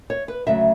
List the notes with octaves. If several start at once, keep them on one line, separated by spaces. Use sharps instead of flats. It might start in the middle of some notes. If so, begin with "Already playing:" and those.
C#5
B4
D2 C#3 F#3 A3 E5